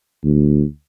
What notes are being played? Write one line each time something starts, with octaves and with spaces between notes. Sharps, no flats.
D2